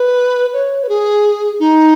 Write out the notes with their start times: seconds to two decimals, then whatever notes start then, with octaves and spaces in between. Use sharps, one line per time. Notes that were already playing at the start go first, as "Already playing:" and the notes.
Already playing: B4
0.53 C#5
0.83 B4
0.89 G#4
1.60 D#4